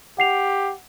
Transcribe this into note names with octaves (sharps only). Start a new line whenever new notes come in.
G4 F#5 C7 F7